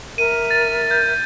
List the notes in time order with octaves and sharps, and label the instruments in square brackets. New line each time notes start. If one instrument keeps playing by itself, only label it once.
[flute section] A#4 E5 [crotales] D#7
[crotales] A6
G6